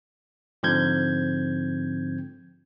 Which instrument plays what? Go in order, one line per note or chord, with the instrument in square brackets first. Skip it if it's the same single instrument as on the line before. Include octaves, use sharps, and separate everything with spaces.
[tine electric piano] G#2 D3 F3 C4 G6 G#6